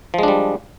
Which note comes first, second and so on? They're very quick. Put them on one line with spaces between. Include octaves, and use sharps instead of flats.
F3 G#3 D4 G3